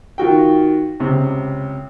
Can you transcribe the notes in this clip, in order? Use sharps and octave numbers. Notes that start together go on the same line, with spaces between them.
D#3 F4 F#4 G5
C#2 C3